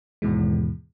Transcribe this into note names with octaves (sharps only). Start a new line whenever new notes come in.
D#2 G#2 B2 E3 G#3